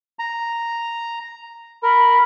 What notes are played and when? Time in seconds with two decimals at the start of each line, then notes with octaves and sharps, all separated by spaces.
0.19 A#5
1.83 A#4 B5